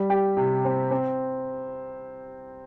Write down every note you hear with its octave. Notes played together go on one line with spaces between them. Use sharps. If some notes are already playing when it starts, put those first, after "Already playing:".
Already playing: G3
G4
C3
C4
C4